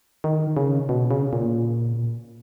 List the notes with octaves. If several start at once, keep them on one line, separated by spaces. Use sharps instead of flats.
D#3
C#3
B2
C#3
A#2